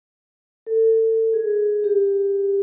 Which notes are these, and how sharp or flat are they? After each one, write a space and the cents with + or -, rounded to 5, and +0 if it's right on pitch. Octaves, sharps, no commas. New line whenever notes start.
A4 +30
G#4 +5
G4 +20